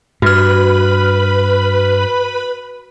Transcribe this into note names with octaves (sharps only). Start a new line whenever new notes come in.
G2 F#4 B4 B5 F6